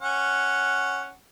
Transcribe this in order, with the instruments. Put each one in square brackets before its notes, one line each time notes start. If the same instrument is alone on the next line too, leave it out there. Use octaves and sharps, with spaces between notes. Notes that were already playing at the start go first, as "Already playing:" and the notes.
[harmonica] C#4 F#5